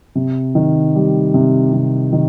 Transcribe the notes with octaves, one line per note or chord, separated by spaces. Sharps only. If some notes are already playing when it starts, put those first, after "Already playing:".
C3
D#3
G3
C3
C3
D#3